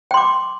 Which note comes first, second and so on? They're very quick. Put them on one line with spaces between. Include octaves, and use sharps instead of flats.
G5 C6 D6